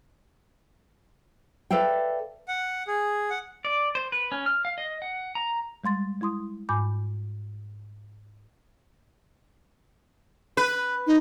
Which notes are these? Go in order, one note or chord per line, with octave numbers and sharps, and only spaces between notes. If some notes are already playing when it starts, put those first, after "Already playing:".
A4 B4 D5 E5 F5 G5
F#5
G#4
F#5
D5
C5
B4
C#4
F6
F5
D#5
F#5
A#5
G3 G#3 C6 A6
G#3 E4 C6 D#6
G#2 G#5 B5 D6 G6
B4
D#4